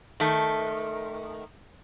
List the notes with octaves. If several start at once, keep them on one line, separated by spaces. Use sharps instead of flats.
D#3 A3